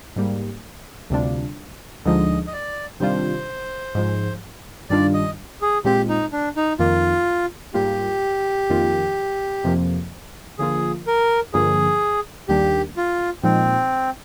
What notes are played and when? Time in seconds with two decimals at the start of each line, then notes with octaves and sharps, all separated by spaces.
0.16 G#2 G3 A#3
1.10 D2 C3 G3 D4 F4
2.05 D2 D3 F3 G#3 D#4 D#5
2.47 D#5
2.53 D5
3.00 C3 D#3 G3 D4 F4 C5
3.95 G#2 F3 G#3
4.90 G2 D#3 G3 D4 F4 D5
5.14 D#5
5.62 G#4
5.85 A#2 G#3 C4 F4 G4
6.09 D#4
6.32 D4
6.56 D#4
6.79 F2 D#3 A#3 F4
7.74 G#2 G3 A#3 F4 G4
8.70 F2 D#3 A#3 F4
9.64 F2 C3 F3 A#3
10.59 D3 F3 A#3 F4 G#4
11.07 A#4
11.54 G2 D3 F3 A#3 G#4
12.48 D#2 D#3 G3 A#3 D4 G4
12.97 F4
13.44 A#2 F3 G#3 C4 D#4